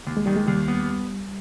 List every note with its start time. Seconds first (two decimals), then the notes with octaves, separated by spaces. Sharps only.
0.07 D#2
0.17 G#3
0.26 D#3 G3
0.36 G#3
0.47 D#2 G3
0.68 B3